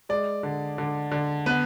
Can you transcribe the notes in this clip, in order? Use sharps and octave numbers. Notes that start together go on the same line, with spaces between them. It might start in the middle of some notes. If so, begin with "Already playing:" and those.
G#3 D5
D3
D3
D3
B3 B4